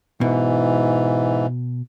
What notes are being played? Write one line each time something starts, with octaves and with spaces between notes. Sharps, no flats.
G#2 B2 E3